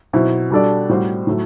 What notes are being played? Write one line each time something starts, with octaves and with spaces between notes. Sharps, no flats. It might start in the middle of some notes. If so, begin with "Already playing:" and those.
B2 F#3 C4 E4
B2 G3 D4 A4 D5
A2 G3 C4 F#4 C5
A2 F#3 A3